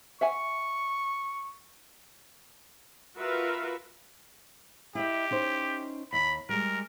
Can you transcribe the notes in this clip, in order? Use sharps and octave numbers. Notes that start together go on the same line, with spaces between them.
E5 F#5 G#5 C#6
F4 F#4 A#4 B4 E5 F5
E4 G4 D#5 E5
C#4 D#4 C5
D#2 B5
G3 G#3 A#4